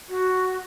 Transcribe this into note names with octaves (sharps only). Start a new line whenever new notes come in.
F#4